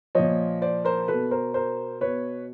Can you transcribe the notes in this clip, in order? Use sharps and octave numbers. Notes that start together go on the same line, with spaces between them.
A#2 F3 C#5 D#5
C5 D5
A#4 C5
B2 A4 B4
A#4 C5
A#4 C5
B2 B4 C#5